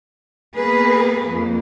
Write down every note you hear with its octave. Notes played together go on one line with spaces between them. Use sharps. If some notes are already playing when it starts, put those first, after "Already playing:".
A#3 B3 G#4 A#4 B4
F2 A#3